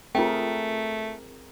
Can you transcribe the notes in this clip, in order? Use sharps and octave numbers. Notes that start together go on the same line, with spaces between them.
A3 C4 F4 G#4 A#4 G5